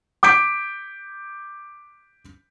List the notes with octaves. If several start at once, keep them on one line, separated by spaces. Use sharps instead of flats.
D6 G6 B6 D7